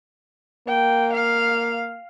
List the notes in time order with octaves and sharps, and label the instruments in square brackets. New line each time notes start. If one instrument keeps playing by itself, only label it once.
[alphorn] A#3 [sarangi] G5
[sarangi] F5